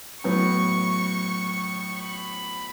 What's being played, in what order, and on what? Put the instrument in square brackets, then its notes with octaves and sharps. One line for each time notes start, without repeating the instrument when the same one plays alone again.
[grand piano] A2 F#3 B3 [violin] C#6
[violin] B5